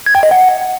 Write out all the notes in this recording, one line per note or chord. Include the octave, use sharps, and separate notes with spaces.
G#6
G5
D#5
F#5